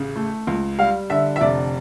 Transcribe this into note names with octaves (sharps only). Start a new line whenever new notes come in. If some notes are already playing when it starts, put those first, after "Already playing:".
Already playing: A1 C#3
A3
C#2
G3 F5
D3 E5
E5
F1 D5